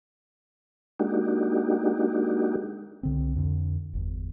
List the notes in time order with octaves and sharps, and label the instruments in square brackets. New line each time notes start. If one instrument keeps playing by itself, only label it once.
[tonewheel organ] G#3 A#3 D4 D#4 F#4 G4
[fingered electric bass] C2 D3 C4
F2 D3
G1 E2